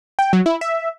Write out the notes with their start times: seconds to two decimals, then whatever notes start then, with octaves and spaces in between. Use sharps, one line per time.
0.19 G5
0.33 F#3
0.46 E4
0.61 E5